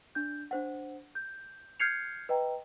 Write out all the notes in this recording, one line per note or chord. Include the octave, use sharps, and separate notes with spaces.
D4 G6
D4 C5 F#5
G6
F6 G6 G#6 C7 C#7 F7
B4 D#5 G5 A#5